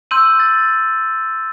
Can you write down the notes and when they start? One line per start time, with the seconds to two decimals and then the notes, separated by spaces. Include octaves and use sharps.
0.11 C6 E6 G6 D#7 F#7
0.40 A6